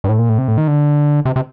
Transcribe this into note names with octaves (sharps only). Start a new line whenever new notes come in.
G2
A2
A#2
A2
C3
A2
D#3
D3
C3
C3